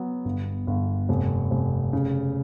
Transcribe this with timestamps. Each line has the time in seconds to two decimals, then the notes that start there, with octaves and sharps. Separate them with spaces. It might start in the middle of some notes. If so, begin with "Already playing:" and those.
Already playing: F#3 B3
0.25 G1
0.67 G1
1.09 F1
1.51 F1
1.93 C#3